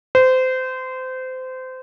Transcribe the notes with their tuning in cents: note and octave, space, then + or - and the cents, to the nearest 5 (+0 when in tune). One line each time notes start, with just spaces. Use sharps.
C5 -25